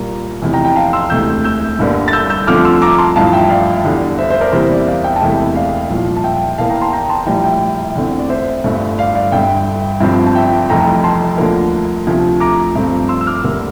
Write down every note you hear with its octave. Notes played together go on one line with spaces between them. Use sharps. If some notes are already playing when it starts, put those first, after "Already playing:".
Already playing: C2 A#2 G3 A#3 A#5
F1 E2 C3 E3
G5 A#5
G5 A#5
F5 A5
C6 E6
E1 D2 C3 E3 A3 E6 G6
E6 G6
G1 G2 D3 G3 A#3
A6
E6 G6
E6 G6
D2 D3 F3 A3 C4 D6 F6
C6 E6
E6
A#5 D6
A5 C6
A1 G2 F3 F5 A5
E5 G5
D5 F5
E2 D3 G3
C5 E5
C5 E5
A#4 D5
E2 C3 E3 G3 A#3 C5 E5
D5
E5
D5 F5
E5 G5
A5
E1 E2 C3 E3 A3 E5 G5
D5 F5
C2 A#2 F3
A5
E5 G5
E2 E3 A#3 F5 A5
G5 A#5
A5 C6
G5 A#5
A5 C6
A#1 A2 G3 G5 A#5
E5 G5
E2 D3 A3 C4
D5
C5 E5
G1 G2 D3 A3
D5 F5
D5 F5
G1 G2 D3 E5 G5
G1 G2 F3 C4
A5
E5 G5
F1 F2 E3 A3 G5 A#5
A5 C6
D2 D3 F3 A#3
D2 C3 F3 A3
A#5 D6
G2 F3 A3 C4
C6 E6
E6
D6 F6
D2 D3 G3 A#3